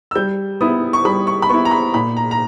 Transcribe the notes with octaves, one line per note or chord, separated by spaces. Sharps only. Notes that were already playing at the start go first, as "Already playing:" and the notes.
E6
G3 G6
B3 E4 D#6
C#6
G3 B5
C#6
B5
B3 E4 C#6
A#5
B5
A#2 B5
A#5
A#5